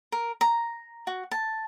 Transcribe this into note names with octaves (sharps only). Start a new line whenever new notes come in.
A#4
A#5
F#4
A5